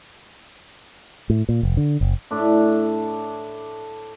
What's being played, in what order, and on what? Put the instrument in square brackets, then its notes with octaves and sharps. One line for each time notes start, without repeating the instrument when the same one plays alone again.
[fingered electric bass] A2
A#2
F1
D3
F#1
[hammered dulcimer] A2 D4